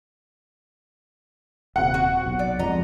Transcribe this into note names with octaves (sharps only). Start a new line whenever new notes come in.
D#1 C3 F#5
F#4
B1
D5
F2 G#3 D#5 A#5